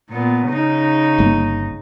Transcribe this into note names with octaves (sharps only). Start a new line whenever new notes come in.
A#2 B3
C#3 D#4
G1 A#3